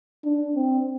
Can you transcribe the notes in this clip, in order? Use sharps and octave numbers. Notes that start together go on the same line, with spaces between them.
D4
C4